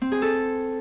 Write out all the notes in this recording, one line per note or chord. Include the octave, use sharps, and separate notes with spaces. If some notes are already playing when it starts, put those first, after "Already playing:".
C4
G#4
A4